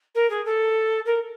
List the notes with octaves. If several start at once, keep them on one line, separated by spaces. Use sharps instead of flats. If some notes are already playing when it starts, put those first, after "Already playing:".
A#4
G#4
A4
A#4